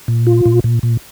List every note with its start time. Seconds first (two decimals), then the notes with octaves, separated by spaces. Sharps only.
0.08 A#2
0.27 F4
0.45 A#2
0.64 A#2
0.83 A#2